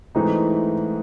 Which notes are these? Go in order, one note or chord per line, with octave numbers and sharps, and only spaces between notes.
G#2 E3 A3 C4 D#4